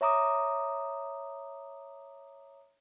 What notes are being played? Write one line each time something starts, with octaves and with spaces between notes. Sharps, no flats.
C#5 E5 A#5 D6 D#6